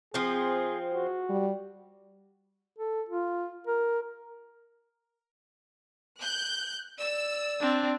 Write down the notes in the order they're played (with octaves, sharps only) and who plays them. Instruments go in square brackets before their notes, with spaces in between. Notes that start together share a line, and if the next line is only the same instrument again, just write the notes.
[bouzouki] F3 C4 [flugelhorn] G#4
[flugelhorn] F#4
[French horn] G3
[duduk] A4
F4
A#4
[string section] F#6 G6
[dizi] D5 [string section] E6
[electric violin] C4 D4